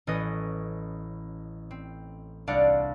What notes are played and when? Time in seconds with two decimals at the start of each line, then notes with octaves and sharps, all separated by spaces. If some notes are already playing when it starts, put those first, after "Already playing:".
0.07 A1 C#4 B4 D#5 C#6 D#6
1.71 C4
2.47 C2 D4 D5 F5 F#5 C#7